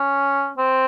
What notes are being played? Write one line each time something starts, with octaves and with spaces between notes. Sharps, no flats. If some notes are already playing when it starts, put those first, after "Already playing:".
Already playing: C#4
C4